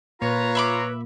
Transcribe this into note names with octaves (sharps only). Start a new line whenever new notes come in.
A#2 A#3 F4 B4 C#5 A#5
E5 B5 D6